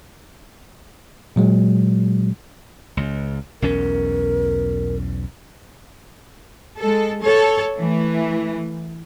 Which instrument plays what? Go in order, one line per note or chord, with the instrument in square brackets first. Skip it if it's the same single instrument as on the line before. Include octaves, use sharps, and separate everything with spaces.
[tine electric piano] A#2 F#3 G#3
[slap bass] C#2
[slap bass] B1 E2 C#4 [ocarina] A#4
[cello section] G#3 A4
A4 C#5
E3 A3